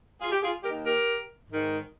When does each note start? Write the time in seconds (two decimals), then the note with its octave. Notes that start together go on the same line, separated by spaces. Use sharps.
0.20 F4 G#4
0.31 G4
0.42 F4 G#4
0.63 D#2 G4 A#4
0.66 D#3
0.84 G4 A#4
1.48 G#2 D#3